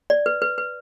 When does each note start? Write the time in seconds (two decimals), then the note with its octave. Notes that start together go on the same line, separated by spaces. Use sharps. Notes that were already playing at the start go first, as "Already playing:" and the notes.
0.10 D5
0.26 B4
0.42 B4
0.58 B4